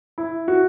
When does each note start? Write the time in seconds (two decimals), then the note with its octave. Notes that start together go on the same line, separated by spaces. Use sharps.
0.18 E4
0.48 F#4